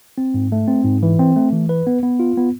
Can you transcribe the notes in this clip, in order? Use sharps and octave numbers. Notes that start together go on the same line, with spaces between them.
C4
G#2
A3
C4
G#2
E3
C4
A3
E3
B4
B3
B3
F4
B3